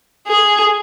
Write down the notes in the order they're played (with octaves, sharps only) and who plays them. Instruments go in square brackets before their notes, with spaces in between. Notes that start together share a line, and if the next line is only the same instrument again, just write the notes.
[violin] G#4